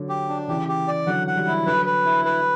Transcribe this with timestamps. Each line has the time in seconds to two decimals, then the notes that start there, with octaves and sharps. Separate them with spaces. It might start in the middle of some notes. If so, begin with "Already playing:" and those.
Already playing: D3 F#3
0.09 G4
0.29 D4
0.48 C#3 E3 G4
0.68 G4
0.88 D5
1.07 D3 F#3 F#5
1.27 F#5
1.36 E3 G3
1.47 E4
1.66 D3 F#3 B4
1.86 B4
2.05 E4
2.25 B4